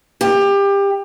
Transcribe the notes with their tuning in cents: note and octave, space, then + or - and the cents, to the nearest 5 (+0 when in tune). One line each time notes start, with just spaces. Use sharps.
G4 +25